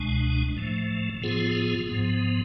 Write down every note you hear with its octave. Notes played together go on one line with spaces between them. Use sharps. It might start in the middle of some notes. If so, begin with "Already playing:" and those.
Already playing: C#2 B2 G#3 D4
A2 F3 A3
A2 F3 B3 F4 G#4
G#2 F3 B3